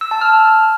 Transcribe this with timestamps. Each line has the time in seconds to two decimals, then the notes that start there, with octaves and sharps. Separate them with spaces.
0.01 E6
0.11 A5
0.21 F6